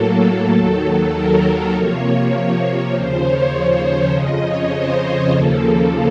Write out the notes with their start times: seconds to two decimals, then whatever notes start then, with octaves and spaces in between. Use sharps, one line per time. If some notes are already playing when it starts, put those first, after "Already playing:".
Already playing: A2 F#3 A#3 A4
0.55 D#2 D#3 F#3
1.15 A#4
1.75 C3 F3 A#3 C#5
2.94 D#2 C#3 F3 C5
3.23 C#5
3.84 C#5
4.13 F2 C#3 F3 D#5
4.43 C#5
4.74 C5
5.33 D#2 C#3 F3 A#3 A4